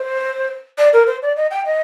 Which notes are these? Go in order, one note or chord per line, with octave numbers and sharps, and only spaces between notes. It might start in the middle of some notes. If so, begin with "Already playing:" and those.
Already playing: C5
D5
A#4
C5
D5
D#5
G5
D#5